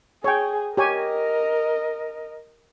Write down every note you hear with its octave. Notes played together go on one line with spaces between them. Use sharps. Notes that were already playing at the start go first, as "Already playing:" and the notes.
G#4 C#5 G5
G4 A#4 C#5 D#5 G#5